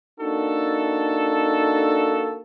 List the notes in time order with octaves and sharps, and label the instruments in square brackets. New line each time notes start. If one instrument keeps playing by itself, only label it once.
[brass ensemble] A#3 D4 D#4 F#4 A4